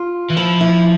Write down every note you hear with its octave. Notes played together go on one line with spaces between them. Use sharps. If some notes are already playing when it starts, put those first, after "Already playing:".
Already playing: F4
E3
F3 E4
E4